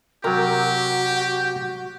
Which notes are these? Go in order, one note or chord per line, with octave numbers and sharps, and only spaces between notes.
C3 F#3 F#4 G4 A#4